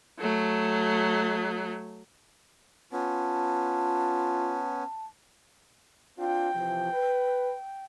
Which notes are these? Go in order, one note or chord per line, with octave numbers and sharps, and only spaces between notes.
F#3 A3
B3 C#4 F4 A5
C4 D4 F4 G5
C3 E3 F3
B4